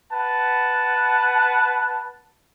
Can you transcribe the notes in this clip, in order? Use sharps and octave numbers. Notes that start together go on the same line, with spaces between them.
B4 F#5 A5